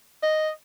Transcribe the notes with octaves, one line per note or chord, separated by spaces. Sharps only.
D#5